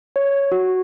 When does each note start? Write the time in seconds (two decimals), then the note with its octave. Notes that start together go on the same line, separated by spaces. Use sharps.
0.16 C#5
0.52 F#4